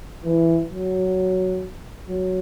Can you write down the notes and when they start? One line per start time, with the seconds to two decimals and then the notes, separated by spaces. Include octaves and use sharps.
0.24 E3
0.70 F#3
2.08 F#3